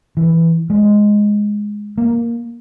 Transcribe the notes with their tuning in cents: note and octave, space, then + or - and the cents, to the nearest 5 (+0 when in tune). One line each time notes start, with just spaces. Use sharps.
E3 +5
G#3 +0
A#3 +5